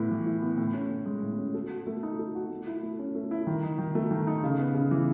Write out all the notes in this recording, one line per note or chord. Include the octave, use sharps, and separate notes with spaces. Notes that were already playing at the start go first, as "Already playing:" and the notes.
Already playing: A2 B3 E4
E3
E4
B3
A2
C#4
A2
G#3
A2
C#4
A4
F#4
A3
D#4
A4
F#4
A3
E4
A3
C#4
A3
E4
D#3
D#4
D#3
A3
D#3
D#4
C#3
B3
C#3
E3